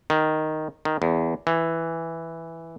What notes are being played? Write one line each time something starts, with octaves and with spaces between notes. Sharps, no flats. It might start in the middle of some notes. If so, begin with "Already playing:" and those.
D#3
D#3
E2
E3